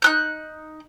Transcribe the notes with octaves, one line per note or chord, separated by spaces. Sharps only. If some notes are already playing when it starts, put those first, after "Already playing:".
D#4 F#6 G6